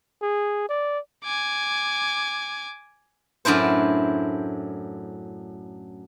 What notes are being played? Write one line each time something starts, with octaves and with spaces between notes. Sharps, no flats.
G#4
D5
G#5 D6
F#2 A2 D4 E4 C5